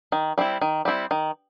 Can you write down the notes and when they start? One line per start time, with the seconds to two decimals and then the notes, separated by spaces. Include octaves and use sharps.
0.12 D#3
0.38 G3 C4 E4
0.61 D#3
0.85 G3 C4 E4
1.11 D#3